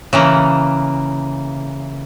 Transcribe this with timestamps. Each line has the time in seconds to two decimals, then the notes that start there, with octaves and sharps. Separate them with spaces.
0.13 C#3 E3 A#3